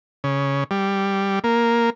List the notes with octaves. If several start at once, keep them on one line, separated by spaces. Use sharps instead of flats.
C#3
G3
A#3